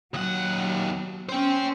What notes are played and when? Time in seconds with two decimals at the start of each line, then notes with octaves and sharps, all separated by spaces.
0.14 D#2 F#3 F#5
1.29 C#4 C5 G5